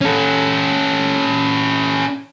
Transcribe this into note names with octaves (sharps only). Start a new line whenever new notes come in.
C#4 A4